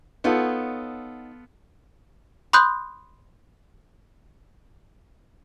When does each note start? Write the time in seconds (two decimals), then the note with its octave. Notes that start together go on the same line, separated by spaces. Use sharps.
0.24 B3 D#4 F4 A4 C#5 F#5
2.53 B5 C6 D#6 F#6 G6